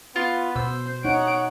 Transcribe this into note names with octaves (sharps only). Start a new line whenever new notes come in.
B3 F4
B2 C5 E6
D#4 C#5 F#5 D7